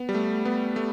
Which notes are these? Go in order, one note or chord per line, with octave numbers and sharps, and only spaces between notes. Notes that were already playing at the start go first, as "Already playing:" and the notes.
Already playing: B3
G3
A3
B3
A3